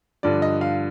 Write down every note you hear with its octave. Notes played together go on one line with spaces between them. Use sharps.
G2 D3 F3 D5
D#5
F5